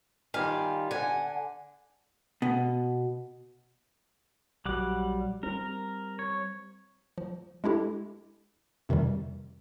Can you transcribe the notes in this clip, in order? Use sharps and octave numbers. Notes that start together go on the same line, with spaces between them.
D#3 G3 F4 F5 G#5
D3 F#5 G#5
B2
A#1 F#3 G3 F#5 D6
G3 C4 A#4
C#5
F3
G#3 D4 E4 G4 A4
F2 C3 D#3 E3 G3